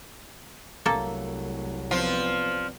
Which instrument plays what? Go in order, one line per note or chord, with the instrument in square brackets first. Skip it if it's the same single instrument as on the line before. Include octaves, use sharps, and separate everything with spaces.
[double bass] C2 F#3 [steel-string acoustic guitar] A3 [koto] A#3 A4
[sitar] F3 F4 [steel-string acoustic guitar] B3 C4 D5